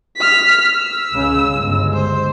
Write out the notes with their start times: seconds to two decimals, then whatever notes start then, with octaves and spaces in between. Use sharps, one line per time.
0.17 F6 B6
0.76 E6
1.12 C#2 C#3
1.52 G1 G#3
1.94 C5